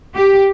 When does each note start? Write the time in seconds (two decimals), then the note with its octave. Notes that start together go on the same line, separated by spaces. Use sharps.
0.15 G4